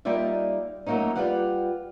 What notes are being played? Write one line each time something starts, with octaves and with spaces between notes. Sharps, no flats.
G3 A#3 D#4 F4 D5 E5
F#3 A3 A#3 C#4 D#4
G3 F4 G4 B4 F5 F#5